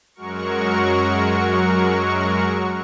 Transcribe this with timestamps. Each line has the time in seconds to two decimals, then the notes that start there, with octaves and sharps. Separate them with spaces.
0.15 F#2 F#3 G#3 F#4 A#4 C#6